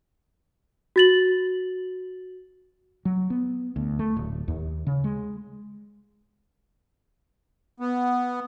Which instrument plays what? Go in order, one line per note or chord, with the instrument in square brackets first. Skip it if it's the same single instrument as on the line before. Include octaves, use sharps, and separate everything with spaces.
[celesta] F#4 A6 F#7
[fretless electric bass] F#3
B3
D2
A3
D1
D#2
C#3
G#3
[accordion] B3